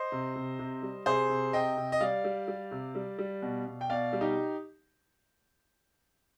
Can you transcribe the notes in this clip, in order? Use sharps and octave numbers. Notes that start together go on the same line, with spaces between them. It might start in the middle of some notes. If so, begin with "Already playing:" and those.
Already playing: C5 D#5
C3
C3
C3
G3
C3 G#4 C5
C3
C3 D#5 G5
C3
D#5
G3 D5 F5
G3
G3
C3
G3
G3
B2
B2
G5
B2 D5 F5
G3
D#4 G4